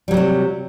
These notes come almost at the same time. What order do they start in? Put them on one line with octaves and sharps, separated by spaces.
G3 F#3 C3 C4